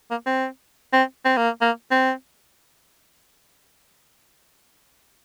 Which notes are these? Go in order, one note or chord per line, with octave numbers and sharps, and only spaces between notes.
A#3
C4
C4
C4
A#3
A#3
C4